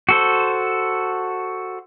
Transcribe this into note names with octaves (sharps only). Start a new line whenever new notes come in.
F#4 A4 C5